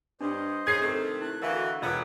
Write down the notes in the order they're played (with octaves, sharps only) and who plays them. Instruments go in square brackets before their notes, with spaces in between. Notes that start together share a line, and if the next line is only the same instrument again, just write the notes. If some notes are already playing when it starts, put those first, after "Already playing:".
[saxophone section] G2 [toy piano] D4 [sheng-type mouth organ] C5 D#5
[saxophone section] C#4 D#4 G#4 [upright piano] G#6 C7
[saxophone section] C3 D#3 A3
[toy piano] E4 [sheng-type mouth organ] F#6
[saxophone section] D2 E3 [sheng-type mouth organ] F#4 B4 [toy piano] A#4 D#5 F5
[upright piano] E1 D6 [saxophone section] D3 B3 [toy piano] F4 [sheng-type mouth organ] C#5 F#5 B5